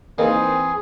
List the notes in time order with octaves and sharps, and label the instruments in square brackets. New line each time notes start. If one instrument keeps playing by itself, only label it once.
[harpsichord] E3 [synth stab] A#3 D#4 A#4 [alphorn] C4 [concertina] G#4